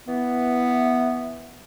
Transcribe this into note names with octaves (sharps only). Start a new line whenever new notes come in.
E3 B3